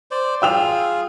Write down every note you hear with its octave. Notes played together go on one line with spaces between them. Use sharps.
C5 D5
F4 G#4 G5 E6 F7